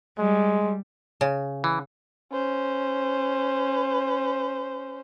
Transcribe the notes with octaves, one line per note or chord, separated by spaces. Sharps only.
G3 G#3
C#3
E3
C#4 C5